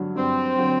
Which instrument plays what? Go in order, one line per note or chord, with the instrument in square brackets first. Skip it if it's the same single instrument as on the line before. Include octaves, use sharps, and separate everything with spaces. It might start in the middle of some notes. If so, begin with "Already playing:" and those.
Already playing: [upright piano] G2 D3 F#3
[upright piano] G2 [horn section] C4
[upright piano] D3 F#3